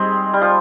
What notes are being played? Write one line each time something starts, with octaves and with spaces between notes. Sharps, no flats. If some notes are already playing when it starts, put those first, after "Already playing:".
Already playing: G3 G#3 C4 D#4 G#4
G3
F3